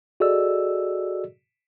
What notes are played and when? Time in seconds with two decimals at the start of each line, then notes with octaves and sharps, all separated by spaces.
0.20 F#4 G#4 A4 D5 D#5 E6